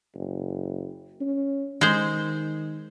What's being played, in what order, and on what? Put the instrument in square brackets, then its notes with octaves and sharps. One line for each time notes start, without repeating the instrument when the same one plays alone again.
[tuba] F#1
C#4
[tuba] D#3 [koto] G#3 C5